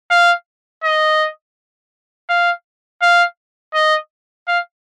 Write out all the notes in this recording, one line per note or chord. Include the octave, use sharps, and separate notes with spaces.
F5
D#5
F5
F5
D#5
F5